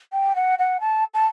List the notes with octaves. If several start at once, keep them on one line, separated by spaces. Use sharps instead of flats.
G5
F#5
F#5
A5
A5